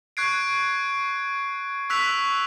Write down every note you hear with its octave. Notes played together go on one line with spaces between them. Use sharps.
C#6 F#6 G#6 C7 D7
C#6 E6 F#6 B6 F7